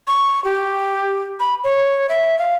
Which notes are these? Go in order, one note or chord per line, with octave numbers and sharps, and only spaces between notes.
C#6
G4
B5
C#5
E5
F5